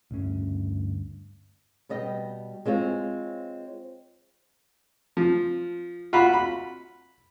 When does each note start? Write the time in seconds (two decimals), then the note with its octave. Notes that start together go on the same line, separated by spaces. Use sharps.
0.11 D2 G2 C#4
1.89 B2 G3 D#5 G5
2.66 G#3 C4 F4 C#5
5.17 F3
6.13 F4 F#4 F5 B5
6.33 B5